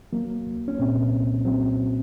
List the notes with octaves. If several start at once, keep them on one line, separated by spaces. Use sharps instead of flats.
F#3 A#3
C2
C#4
A#2 C4
C2
F#3 C4